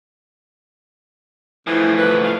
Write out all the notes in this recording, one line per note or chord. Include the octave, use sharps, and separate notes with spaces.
A2 C#3 E3 F3
E3 B4
F5